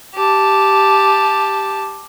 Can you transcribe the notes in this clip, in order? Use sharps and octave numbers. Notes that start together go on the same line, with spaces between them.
G4 A5